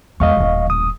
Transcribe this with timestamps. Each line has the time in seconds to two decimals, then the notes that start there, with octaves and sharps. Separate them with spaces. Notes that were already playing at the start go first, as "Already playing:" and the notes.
0.20 E2 G#3 D#5 F5 C#6
0.37 D#1 A1
0.70 D#6